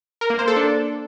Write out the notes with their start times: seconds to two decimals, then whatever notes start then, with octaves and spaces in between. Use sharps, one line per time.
0.21 A#4
0.30 A#3
0.39 C5
0.48 A4
0.56 D4